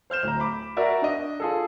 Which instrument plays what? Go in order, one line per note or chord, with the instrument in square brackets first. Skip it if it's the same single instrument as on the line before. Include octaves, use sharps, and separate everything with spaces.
[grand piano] C5 F6 G6 E7
D1 A#5
B5 D6
F#4 A#4 D5 E5
D4 D#5
F4 G#4 A4